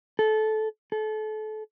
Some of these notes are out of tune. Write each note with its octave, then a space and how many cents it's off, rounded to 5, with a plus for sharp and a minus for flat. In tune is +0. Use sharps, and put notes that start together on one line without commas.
A4 -20
A4 -30